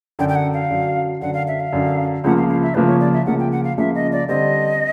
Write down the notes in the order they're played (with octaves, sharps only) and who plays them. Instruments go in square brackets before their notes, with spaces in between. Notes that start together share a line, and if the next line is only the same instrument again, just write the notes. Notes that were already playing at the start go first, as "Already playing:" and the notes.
[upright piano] F#2 D3 F#3 [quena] G5
[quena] G5
F#5
F5
[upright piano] F#2 D3 F#3
[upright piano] F#2 D3 F#3 [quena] F#5
[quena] F5
E5
F5
[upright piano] F#2 D3 F#3
[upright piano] C#2 C#3 F3 A#3 [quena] F#5
[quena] F5
F5
E5
[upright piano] C#2 C#3 F3 A#3 [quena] B4
[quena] C#5
D5
E5
[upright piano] C#2 C#3 F3 A#3 [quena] F#5
[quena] G5
F#5
F5
[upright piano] C#2 C#3 F3 A#3 [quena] E5
[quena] D#5
D5
[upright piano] D3 G3 C4 [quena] D#5